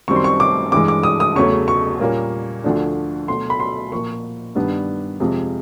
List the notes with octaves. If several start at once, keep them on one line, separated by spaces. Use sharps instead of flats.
F#2 D#3 G3 C4 C#6
C6
C#6
D6
G2 E3 G#3 D6
D6
D#6
D#6
E2 C#3 F#3 A3 C#4 C#6
C#6
A#2 G3 A#3 C#4
D2 D3 F3 A3 D4
B2 F#3 A3 C6
B5
C6
A#2 F3 A#3 C#6
G2 D#3 G3 B3 D4
F2 C3 F3 G#3